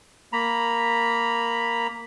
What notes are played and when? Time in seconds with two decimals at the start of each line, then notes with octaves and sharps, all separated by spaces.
0.33 A#3 A#5 B5